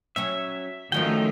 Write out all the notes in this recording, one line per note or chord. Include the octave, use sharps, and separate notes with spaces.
F#3 C#4 C#5 E5
D#3 F3 A3 C#4 F#4 G5